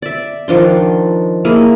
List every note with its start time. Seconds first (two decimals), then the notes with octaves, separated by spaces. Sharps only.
0.02 D5 E5
0.48 D#3 F3 D4 C6
1.45 A#3 E4 G#4